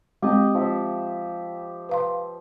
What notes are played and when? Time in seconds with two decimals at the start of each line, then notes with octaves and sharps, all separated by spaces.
0.23 G#3 C4 G4 D#5
0.55 F3 E5
1.89 B4 F5 C6